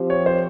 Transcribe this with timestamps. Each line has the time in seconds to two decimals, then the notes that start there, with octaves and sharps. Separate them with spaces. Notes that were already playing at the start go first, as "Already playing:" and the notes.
Already playing: F3 C4 G4
0.10 C#5
0.26 C5